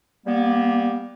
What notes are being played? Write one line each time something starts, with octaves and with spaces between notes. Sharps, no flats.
G3 A#3 B3